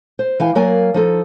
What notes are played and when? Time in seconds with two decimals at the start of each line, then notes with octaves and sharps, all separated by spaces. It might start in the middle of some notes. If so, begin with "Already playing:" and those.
0.19 C5
0.40 E3 F5 G5 G#5
0.55 F#3 A#3 A#4 D5 F5 G#5
0.94 F3 D#4 A4